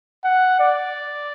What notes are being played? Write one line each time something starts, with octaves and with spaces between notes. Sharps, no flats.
F#5
D5